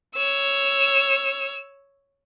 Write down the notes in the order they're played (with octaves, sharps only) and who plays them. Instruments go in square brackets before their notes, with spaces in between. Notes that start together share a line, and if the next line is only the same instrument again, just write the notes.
[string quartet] C#5 E6